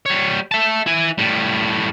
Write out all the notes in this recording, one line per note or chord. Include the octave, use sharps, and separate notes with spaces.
G3 C#5
E5 A5
E4 G#5
A2 G3